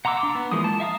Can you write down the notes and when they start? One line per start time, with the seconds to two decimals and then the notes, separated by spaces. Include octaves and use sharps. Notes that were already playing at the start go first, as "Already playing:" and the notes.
0.05 F#5 A#5 C6 D6 E6
0.23 D4
0.35 B3
0.52 E3 F3 G#3 A#3 D#6
0.64 A5
0.80 E5 F5 A#5 D#6